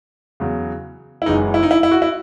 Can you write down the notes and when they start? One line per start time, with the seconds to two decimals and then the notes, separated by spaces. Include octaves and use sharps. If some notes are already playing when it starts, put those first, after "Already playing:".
0.40 E2 C#3 F#3
1.22 E4
1.26 F#1 F#2 E3 G#3 D#4
1.54 E4
1.63 D#4
1.71 E4
1.83 E4
1.92 F#4
2.02 E4